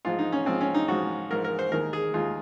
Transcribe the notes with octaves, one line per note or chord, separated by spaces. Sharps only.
G#2 F3 G#3 F4
D#4
C#4
G#2 F3 G#3 C4
C#4
D#4
G#2 F3 G#3 F#4
G#2 F3 G#3 A#4
A#4
C5
D#2 D#3 G#3 A#4
G#4
D#2 D#3 G#3 F4